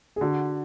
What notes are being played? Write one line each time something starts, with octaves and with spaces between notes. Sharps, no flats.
G#4
D3 F#4